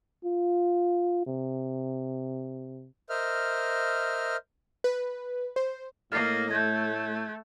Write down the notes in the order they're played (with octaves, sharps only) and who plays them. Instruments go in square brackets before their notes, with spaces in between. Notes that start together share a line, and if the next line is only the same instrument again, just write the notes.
[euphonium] F4
C3
[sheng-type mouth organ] A#4 C5 D#5 E5 F6
[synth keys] B4
C5
[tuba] A2 [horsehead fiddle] A#3 D#5 [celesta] F6 A6 C7
[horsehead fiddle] A3 [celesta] G6 G#6